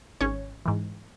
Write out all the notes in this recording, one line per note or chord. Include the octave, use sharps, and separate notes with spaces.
G#1 C#4 C#5
G#2 E3